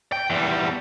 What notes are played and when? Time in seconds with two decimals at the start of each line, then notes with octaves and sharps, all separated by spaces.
0.12 G5
0.30 E2 G3